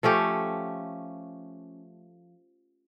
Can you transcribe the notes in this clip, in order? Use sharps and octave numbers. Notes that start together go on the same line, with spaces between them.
F3 A3 C#4 G4